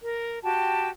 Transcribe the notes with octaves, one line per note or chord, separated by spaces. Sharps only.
A#4
F#4 G4 G5 A5